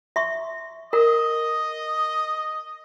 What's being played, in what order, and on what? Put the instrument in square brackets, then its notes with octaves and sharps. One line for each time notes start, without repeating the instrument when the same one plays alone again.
[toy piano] E5 C6 C#6
[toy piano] A#4 [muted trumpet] D#5